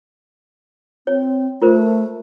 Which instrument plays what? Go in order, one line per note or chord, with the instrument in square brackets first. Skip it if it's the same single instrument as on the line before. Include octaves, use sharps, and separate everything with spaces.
[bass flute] C4 [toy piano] C#5
[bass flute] A3 [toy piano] F4 A#4 C5